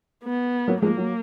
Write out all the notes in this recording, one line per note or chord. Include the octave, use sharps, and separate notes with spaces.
B3
F#3 A#3
F3 G#3 A#3
F#3